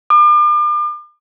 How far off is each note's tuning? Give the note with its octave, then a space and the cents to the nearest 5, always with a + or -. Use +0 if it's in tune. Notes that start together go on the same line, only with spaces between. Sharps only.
D6 +40